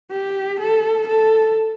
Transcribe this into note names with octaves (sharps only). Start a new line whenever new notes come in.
G4
A4
A4